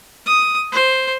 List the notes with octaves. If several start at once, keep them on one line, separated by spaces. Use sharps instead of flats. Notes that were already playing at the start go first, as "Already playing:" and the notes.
D#6
C5